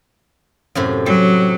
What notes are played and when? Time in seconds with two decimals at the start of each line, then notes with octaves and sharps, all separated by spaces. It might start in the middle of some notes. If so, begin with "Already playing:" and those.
0.75 F#2 A2 C3
1.06 F#3 G4